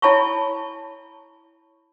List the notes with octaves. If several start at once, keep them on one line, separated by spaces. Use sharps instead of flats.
E4 C#5 G#5 A5 B5 C#6